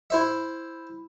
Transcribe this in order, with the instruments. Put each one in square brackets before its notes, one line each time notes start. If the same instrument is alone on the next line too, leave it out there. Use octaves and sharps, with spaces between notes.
[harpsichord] E4 C5 E5